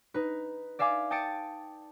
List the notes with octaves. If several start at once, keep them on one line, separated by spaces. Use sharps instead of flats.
D#4 B4
D5 E5 F5 G#5 D6
G5 A5 D#6 A6 C#7 D7